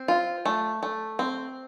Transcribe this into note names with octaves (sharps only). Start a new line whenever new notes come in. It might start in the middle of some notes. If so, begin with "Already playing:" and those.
Already playing: C4
F4
A3
A3
C4